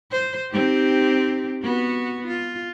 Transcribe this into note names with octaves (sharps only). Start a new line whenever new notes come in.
C5
C4 D#4 G4
B3 F#4
F4